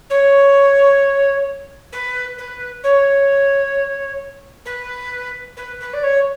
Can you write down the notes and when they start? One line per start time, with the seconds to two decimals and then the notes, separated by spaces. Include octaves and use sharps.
0.10 C#5
1.92 B4
2.38 B4
2.83 C#5
4.65 B4
5.56 B4
5.80 B4
5.93 D5
6.03 C#5